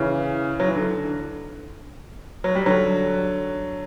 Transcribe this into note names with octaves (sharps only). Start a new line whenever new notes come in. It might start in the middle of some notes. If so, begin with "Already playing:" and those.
Already playing: C#3 E3
F#3
E3
D3
F#3
G3
D3 F#3